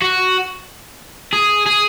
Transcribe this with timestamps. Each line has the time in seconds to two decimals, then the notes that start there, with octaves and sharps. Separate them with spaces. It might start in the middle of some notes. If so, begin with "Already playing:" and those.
0.02 F#4
1.33 G#4
1.66 G#4